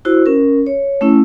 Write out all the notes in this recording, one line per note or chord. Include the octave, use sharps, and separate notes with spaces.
E4 F#4 C5
C#4 A#4
C#5
A3 C#4 E4